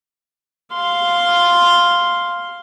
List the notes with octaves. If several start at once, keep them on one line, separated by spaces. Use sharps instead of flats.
F5 C6